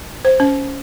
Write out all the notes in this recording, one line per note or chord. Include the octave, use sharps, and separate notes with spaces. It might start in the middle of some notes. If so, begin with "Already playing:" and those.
C5
C#4